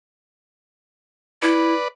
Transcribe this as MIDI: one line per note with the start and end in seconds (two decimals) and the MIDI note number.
1.42 1.73 64
1.42 1.88 71
1.42 1.88 74